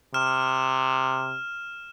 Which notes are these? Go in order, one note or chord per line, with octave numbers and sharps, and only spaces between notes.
C3 F6 E7